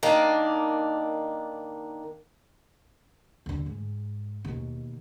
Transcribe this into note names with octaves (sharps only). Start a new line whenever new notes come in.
D#3 A#3 D4
D#2 D3
G#2
D#2 B2